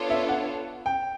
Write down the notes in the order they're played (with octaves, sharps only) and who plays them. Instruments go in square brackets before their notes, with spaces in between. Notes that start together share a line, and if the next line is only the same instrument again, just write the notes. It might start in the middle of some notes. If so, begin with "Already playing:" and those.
Already playing: [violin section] B3 D4 F4 A4 C#5
[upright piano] E5
F#5
G5